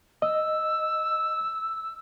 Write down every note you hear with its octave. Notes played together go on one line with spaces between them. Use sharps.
D#5 E6